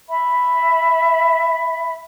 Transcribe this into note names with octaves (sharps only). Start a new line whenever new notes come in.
E5 B5